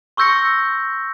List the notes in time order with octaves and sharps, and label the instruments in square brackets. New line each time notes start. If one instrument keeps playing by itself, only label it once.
[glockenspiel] C6 C#6 E6 G6 A#6 C#7